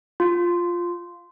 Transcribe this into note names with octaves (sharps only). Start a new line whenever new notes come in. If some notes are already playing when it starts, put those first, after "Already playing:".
F4